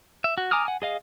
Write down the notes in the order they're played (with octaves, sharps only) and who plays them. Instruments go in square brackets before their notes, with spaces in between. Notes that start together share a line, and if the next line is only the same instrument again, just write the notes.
[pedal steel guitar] E5
F#4
G#5 A#5 D6 D#6 F6
F#5 G#5
G#4 D#5 F5